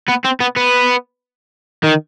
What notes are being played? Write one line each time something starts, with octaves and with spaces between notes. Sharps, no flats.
B3
C4
B3
B3
D#3